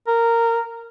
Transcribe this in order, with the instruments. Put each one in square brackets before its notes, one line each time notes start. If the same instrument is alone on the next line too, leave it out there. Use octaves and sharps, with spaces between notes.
[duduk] A#4